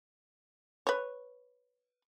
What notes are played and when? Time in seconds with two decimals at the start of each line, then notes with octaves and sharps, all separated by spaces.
0.87 B4 C#5